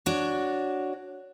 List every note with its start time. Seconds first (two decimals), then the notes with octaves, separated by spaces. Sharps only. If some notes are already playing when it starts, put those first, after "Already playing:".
0.06 D4 F#4 C#5